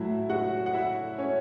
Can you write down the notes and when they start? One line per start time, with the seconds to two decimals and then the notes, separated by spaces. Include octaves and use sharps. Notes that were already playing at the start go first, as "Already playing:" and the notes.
Already playing: A2 F#3 A3 E4 E5
0.30 F#4 F#5
0.66 F#5
0.74 E4 E5
1.18 C#4 C#5